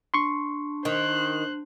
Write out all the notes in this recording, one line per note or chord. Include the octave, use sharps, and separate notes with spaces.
D4 C6 C#6
D#3 C5 F#6